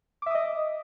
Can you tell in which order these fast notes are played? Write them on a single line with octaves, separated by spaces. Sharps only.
D6 E5 D#6 D#5